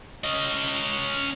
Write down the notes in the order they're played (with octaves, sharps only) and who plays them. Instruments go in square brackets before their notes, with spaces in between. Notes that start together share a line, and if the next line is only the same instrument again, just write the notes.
[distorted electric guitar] C#4 D#5